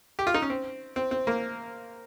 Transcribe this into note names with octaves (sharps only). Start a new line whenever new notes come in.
G4
F4
D#4
C#4
C4
C4
C4
A#3